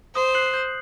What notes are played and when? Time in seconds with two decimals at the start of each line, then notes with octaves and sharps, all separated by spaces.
0.15 C5 D#6
0.34 F#6 C7 F#7
0.54 G6